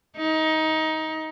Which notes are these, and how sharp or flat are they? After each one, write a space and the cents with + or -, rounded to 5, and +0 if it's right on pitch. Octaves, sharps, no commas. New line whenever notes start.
D#4 +20